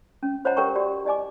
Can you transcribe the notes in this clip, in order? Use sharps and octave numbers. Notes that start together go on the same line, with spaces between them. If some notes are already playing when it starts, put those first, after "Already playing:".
C#4
F4 C5 C#5 D#5 F#5 A#5
G4 A#4 C#5 G5 A#5 C#6
F#4 G4 D5 E5
E4 D5 D#5 G#5 D6